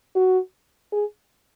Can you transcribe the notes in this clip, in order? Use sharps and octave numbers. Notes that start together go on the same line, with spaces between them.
F#4
G#4